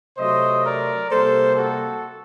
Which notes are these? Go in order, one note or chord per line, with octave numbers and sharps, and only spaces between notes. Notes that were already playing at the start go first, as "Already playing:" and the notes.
C3 F#3 A3 C5 D#5
A#4 D5
C3 G3 A#3 A4 C5
F#4 A4